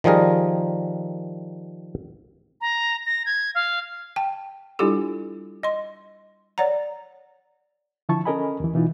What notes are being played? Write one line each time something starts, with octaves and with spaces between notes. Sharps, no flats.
D#3 F3 G3 G#4 A#4
A#5
A#6
G#6
F5
G5 A5
G3 D4 E4 F4 G4 A4
D#5 C6
C#5 D5 F#5 A#5
D3 F3 E4 A5 C#6
C#4 A4 A#4 D#5 G#5 B5
D#2 E3
B2 E3 D#4 F4